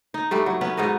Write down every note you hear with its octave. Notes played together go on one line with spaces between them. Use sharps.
D#4
G2 G3 A3
F#3
B3 C#4 B4
G#2 B2 D#4 D#5